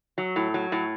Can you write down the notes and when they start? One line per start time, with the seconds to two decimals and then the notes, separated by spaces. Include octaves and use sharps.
0.18 F#3
0.36 A2
0.54 F#3
0.72 A2